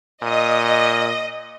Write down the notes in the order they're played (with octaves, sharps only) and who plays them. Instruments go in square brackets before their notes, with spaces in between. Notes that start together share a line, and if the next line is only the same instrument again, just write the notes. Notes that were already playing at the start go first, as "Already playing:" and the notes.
[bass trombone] A#2 [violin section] D#5